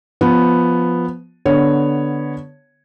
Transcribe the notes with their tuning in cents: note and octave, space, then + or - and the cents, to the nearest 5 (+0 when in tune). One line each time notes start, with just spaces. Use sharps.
F3 +0 B3 +0
D3 +0 B3 +0 C#5 +0